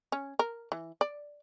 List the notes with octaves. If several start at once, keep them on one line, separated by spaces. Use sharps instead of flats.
C#4
A#4
E3
D5